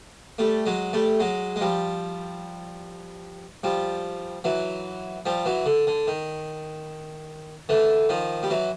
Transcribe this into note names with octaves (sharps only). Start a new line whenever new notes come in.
G3 A3
F#3 G#3
G3 A3
F#3 G#3
G#3
F3 G3
F3 G3
E3 F#3
F3 G3
E3 F#3
D3
D3
D#3
D3 E3
D#3 F3
G3
E3 F#3